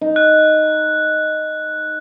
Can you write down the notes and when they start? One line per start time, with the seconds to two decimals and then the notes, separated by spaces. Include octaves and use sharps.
0.01 D#4
0.16 F#6